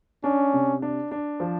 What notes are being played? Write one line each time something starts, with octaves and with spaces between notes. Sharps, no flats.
C#4 D4
C3
D4
D4
F3